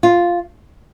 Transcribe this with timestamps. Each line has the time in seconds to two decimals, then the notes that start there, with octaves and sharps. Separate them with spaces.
0.03 F4